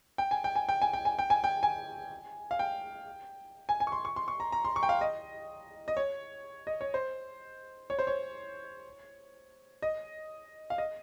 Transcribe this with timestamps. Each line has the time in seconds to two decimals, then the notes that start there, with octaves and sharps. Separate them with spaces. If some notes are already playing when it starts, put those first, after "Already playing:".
0.18 G5
0.31 G#5
0.44 G5
0.55 G#5
0.69 G5
0.82 G#5
0.93 G5
1.05 G#5
1.19 G5
1.30 G#5
1.44 G5
1.63 G#5
2.51 F5
2.59 G5
3.69 G#5
3.80 G#5
3.87 C#6
3.92 C6
4.05 C#6
4.16 C6
4.28 C#6
4.40 A#5
4.52 A#5
4.65 C6
4.76 C#6
4.83 G5
4.89 F5
5.01 D#5
5.88 D#5
5.97 C#5
6.67 D#5
6.81 C#5
6.94 C5
7.90 C#5
7.99 C5
8.07 C#5
9.82 D#5
10.70 F5
10.78 D#5